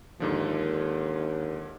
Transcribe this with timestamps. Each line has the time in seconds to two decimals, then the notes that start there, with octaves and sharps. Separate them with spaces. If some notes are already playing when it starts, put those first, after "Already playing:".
0.20 D#2 G#2 D3 F3